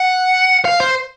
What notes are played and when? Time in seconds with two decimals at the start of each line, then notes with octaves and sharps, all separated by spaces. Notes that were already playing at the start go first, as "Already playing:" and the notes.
Already playing: F#5
0.65 F5
0.80 C5